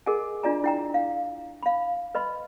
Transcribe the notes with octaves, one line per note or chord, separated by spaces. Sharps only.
G#4 A#4 D#5 F#5 G#5
D4 F4 D5 D#5 G#5 A#5
E4 G5 A#5
F5
F5 B5
B4 D#5 B5 C6